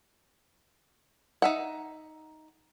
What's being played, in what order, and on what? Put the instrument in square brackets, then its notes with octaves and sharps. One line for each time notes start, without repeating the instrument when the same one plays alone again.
[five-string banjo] D#4 E5 F#5